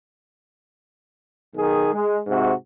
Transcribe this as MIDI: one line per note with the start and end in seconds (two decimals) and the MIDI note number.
1.55 1.87 35
1.55 1.87 51
1.55 1.87 68
1.92 2.19 56
2.27 2.51 44
2.27 2.51 48
2.27 2.51 66